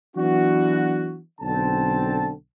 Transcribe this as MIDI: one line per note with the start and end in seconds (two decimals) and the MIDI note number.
0.16 1.19 52
0.16 1.19 54
0.16 1.19 59
0.16 1.19 62
0.16 1.19 66
1.41 2.31 35
1.41 2.31 50
1.41 2.31 60
1.41 2.31 81